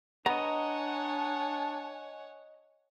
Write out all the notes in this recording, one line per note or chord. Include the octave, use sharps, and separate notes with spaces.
B3 D4 C#5 D#5 F#5 G#5 A#5